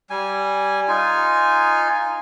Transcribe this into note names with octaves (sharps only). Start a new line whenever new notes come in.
G3 G#5
D#4 F4 G#5